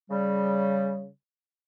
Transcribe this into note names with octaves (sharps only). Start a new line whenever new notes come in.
C#3 G3